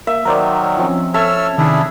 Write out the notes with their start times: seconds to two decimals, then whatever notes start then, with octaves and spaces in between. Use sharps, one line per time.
0.07 A#3 E5
0.25 D#3 F#3 A#4 C5 D5
0.77 F3 C4 C#4
1.14 A4 C#5 E5 E6 F6
1.58 C3 D#3 D4 E4 G#4